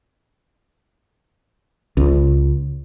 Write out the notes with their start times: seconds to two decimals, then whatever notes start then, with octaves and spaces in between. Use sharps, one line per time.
1.97 C#2